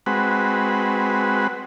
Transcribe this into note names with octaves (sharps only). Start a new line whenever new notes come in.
G#3 C4 F#4 B4